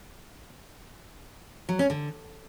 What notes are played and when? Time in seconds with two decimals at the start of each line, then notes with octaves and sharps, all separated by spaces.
1.69 F#3
1.79 C#4
1.90 D3